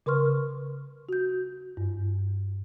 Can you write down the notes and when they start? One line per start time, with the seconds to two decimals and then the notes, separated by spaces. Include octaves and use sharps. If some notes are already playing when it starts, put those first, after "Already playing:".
0.06 C#3 A#4 B4 C6 C#6 F6
1.09 F#4 G6
1.77 G2